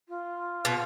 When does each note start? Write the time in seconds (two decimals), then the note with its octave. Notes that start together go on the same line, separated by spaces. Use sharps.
0.09 F4
0.65 B2